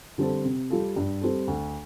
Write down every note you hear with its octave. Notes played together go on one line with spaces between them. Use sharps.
D3 G3 C4 A4
C3
G3 F4 A4
G2
G3 C4 A4
D2